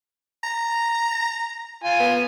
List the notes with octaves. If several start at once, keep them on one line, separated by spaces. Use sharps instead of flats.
A#5
F4 G#5
B3